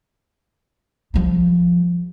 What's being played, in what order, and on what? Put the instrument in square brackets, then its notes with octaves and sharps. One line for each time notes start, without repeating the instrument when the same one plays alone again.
[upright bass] F3 G3